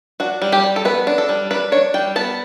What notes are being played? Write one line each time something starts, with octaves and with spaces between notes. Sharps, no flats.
D4 F#4
G3
G4
G3
A4
B3 B4
D4
A4
G3
D4 B4
D4 C#5
G3 G5
B3 A5